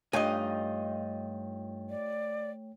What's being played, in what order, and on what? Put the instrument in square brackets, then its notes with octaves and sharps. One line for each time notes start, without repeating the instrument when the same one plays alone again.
[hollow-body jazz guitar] G2 G#5 [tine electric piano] A3 C#5 G5 [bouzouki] D#4 F4 D#5
[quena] D5